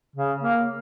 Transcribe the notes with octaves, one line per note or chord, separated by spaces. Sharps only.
C#3
A#3